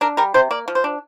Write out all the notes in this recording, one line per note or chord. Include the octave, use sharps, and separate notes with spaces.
D4 A#4
G3 A#4
C3 C5
A#3 D5
F3
C5
D4